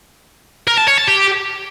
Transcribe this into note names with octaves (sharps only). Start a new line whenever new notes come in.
A#4
A5
C#5
A5
G4